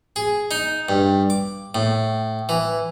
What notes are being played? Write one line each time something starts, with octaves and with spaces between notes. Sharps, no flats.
G#4
D#4
G2
D6
A2
E3